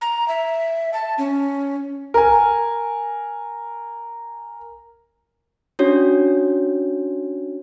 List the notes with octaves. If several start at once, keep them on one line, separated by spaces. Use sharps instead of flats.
A#5
E5
A5
C#4
A#4 G#5
C#4 D4 F#4 C#5